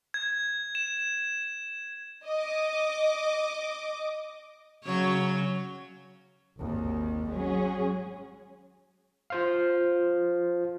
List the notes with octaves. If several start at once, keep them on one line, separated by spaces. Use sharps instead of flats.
G#6
E7
D#5 D6
C#3 F#3 C#5
G#1 D#2
F#3 G#3 C#4 G#4
F4 C5 F5